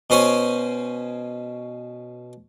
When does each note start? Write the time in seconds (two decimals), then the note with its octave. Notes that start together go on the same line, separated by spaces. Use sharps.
0.10 B2 C#4 C5 C#5 G#5